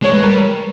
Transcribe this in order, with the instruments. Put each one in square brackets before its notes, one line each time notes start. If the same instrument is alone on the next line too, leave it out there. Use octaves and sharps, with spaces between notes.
[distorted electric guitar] G#3 [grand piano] C#5
[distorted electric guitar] G#3 [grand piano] B4
[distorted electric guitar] G3 [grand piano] A#4